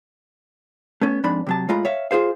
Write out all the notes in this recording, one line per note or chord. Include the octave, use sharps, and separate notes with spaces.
A3 B3 C#4
F2 G#2 D4 B5
C3 F#3 A5
A2 G#3 F4 A#5 B5
C#5 E5 F5
F4 G#4 C5 F5